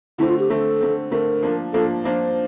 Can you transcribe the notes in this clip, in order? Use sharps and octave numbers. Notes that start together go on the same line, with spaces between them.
D3 A3 C4 E4
F4
G4
D3 A3 C4 A4
D3 A3 C4
D3 A3 C4 A#4
F3 A#3 D4 F4
F3 A#3 D4 F4 A4
F3 A#3 D4 F4 C5